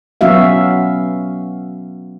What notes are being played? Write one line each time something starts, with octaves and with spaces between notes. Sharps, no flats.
F#3 B3 C#4 F#4 E5 F5